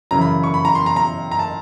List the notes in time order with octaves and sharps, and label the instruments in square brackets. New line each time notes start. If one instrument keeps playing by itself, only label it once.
[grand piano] F#2 C#3 E3 A#5
B5
C#6
B5
A#5
C6
A#5
A#5
A#5
A5